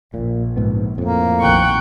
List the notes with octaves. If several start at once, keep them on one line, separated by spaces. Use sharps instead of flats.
A#1 A#2
C#2 G#2 B3
F2 A2 A#3
A#1 D#2 F#5 G5 C#6